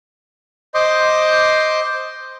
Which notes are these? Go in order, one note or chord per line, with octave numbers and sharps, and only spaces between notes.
C5 D#5 C6 D6